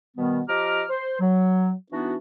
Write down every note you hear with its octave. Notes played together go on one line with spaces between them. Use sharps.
B2 D#3 G3 B3
F3 G4 D#5 A#5 D6 F6
C5
F#3
E3 B3 D4 D#4 F#4